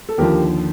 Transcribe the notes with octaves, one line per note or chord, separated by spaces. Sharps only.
A4
D#2 D3 F3 G4 A#4